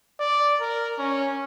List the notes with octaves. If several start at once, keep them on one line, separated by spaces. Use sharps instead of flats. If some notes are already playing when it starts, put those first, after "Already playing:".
D5
A#4
C#4